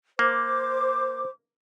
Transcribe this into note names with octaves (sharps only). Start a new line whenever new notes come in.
A#3 C5 D6